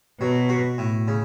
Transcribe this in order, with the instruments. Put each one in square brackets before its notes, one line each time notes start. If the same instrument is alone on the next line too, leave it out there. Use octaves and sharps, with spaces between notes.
[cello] B2 [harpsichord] F#3
[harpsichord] F#4
A2
C#3